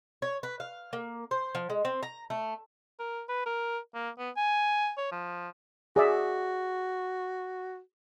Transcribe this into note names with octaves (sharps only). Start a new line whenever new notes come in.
C#5
B4
F5
A#3
C5
F3
G#3
C4
A#5
A3
A#4
B4
A#4
A#3
B3
G#5
C#5
F3
F#4 G#4 D5 E5